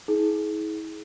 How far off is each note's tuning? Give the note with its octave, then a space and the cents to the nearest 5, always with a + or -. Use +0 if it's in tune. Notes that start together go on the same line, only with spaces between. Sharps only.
E4 -45 G#4 +25